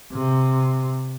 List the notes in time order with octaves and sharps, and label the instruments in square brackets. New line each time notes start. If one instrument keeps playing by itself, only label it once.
[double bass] C3